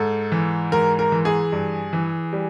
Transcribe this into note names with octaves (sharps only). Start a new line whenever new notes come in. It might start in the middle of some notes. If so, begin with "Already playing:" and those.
Already playing: G#2 A4
E3
G#2 A#4
A#4
E3
G#4
G2
E3
G3